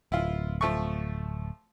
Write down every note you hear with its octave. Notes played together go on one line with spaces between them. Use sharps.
D1 E4 F4
F3 A3 C#6